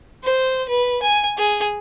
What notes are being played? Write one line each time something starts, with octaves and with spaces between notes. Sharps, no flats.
C5
B4
G#5
G#4